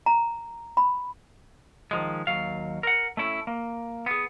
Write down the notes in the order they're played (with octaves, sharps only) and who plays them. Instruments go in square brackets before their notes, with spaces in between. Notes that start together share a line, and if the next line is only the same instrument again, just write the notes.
[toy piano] A#5
B5
[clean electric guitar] D#3 F3 G#3
D#2 F#3 F5
A#4 F#5
A3 C#4 E4
A#3
B3 G#4